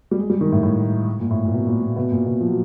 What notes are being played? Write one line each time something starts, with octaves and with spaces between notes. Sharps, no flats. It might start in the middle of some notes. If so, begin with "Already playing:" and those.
G3
G#3
G3
D#3
A2
A2
A#2
A2
A#2
B2
A#2
A#2
B2
A#2
B2
F3
F#3